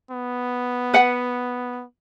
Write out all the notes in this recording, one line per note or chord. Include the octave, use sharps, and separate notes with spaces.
B3
B4 F#5